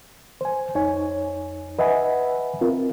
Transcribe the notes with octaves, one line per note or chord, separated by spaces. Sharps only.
C5 G#5
F2 D#4 C#5 G#5
B4 D#5 E5 F#5 G#5 B5
C4 F4 A#4